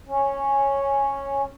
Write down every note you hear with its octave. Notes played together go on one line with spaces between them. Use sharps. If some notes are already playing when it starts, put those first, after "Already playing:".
C#4